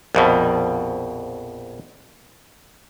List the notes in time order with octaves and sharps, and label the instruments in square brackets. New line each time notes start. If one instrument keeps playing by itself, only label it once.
[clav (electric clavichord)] A#1 F2 B2